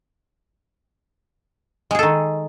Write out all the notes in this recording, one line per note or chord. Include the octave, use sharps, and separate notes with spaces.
D#3 G#3 G#4 A4